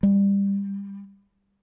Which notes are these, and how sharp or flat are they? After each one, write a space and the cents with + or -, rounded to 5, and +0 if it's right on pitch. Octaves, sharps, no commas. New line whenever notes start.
G3 +25